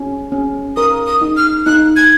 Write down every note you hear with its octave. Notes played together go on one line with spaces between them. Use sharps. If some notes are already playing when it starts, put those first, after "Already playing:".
Already playing: C#4
C#4
A#4 D#6
D#6
D#4
F6
D#4 F#6
G#6